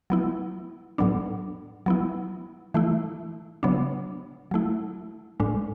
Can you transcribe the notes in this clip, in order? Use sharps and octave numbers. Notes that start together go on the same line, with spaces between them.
F#3 B3 E4
A2 F#3 B3 D4
F#3 B3 E4
E3 A3 E4
C#3 F#3 B3 D4
F#3 A3 E4
A2 G#3 D4